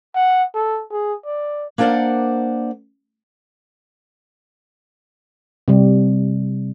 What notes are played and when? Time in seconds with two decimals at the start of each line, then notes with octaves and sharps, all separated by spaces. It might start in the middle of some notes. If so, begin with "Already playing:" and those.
0.15 F#5
0.54 A4
0.92 G#4
1.25 D5
1.78 A#3 D4 A#4 C5 D5 F#5
5.68 C3 G3